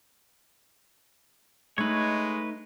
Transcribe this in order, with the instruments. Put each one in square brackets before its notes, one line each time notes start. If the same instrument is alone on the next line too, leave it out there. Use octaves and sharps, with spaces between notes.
[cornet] G#3 [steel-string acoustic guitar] A3 D#4 [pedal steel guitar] B4 C#5